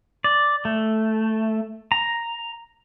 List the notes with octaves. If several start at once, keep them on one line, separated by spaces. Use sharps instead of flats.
D5
A3
A#5